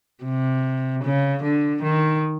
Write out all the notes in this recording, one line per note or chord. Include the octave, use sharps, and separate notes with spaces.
C3
C#3
D3
D#3